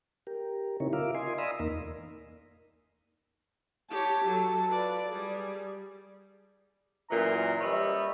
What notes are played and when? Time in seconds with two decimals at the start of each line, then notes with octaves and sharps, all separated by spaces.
0.27 G4 A#4
0.80 C#3 C4 D#4 E4 A#4 C#5
0.93 F4 A#4 E5 F5 D6
1.15 D#5 G#5 C6
1.38 D5 F5 A#5 B5 D#6 E6
1.59 E2 A#3 D#4 A#4 A#5
3.90 G4 C#5 A5
4.25 F#3 A4
4.71 F4 B4 D5
5.09 G3 G#4 D5
7.10 F#2 A#2 E3 A#5
7.61 G3 B4 C#5 D#5 E5